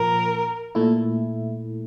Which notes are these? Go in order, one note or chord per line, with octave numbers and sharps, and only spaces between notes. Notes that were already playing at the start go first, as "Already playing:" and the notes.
Already playing: A#2 F3 A#4
A#2 A3 E4